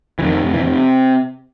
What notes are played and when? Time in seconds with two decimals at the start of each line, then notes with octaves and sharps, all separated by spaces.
0.19 E3
0.23 F2 D#3
0.43 C3
0.54 E3
0.64 C3